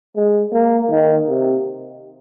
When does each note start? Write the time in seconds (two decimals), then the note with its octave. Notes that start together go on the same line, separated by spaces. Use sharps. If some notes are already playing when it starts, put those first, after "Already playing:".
0.16 G#3
0.53 A#3
0.91 D#3
1.29 C3